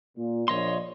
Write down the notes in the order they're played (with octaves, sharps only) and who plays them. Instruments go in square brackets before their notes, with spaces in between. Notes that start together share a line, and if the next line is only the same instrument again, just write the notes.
[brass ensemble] A#2
[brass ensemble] A#1 A#2 [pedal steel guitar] C#5 D#5 C6